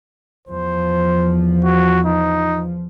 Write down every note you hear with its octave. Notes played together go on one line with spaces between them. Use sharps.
E2 F3 C5
F#4
D#4